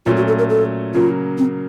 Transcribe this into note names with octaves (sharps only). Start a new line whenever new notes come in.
A#2 F#3 A3 C#4 F4
F#4
A4
A#4
A4
C#3 F#3 A#3 F4
C4